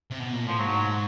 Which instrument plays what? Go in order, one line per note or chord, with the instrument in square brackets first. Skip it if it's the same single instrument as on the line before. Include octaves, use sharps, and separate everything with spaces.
[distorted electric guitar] C3
B2
A#2
[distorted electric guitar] A2 [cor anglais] F3
[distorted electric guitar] G#2 [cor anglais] F#3